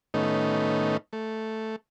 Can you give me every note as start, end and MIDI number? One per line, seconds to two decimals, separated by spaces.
0.14 0.97 45
0.14 0.97 51
0.14 0.97 57
0.14 0.97 59
0.14 0.97 61
0.14 0.97 63
1.13 1.76 57